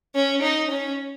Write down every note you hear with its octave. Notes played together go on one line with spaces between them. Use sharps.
C#4
D#4
C#4